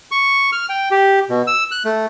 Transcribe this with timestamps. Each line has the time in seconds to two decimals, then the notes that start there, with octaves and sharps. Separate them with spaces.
0.11 C#6
0.53 F6
0.69 G5
0.91 G4
1.30 B2
1.47 E6
1.71 F#6
1.85 A3